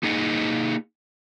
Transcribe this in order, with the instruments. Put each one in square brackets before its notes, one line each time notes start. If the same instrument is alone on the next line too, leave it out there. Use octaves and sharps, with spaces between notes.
[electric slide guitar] A#3 D#4 G#4 D#5 F#5